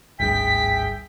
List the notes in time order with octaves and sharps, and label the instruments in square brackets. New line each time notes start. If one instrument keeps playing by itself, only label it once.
[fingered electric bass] G#1 D2 G2 [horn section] G#4 E5 G5 [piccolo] B6